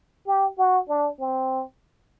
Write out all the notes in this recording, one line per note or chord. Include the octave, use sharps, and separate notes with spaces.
G4
F#4
D4
C4